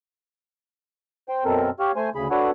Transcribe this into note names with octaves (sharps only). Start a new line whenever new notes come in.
C5 G5
F#2 B2 C4 A4 A#4
G4 C#5 F5
A3 C5 G#5
D2 C#3 G#4 B5
D4 F#4 A4 B4 C#5 F#5